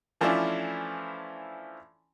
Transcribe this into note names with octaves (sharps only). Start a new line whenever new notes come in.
E3 F3 A3 C#4 D4 E4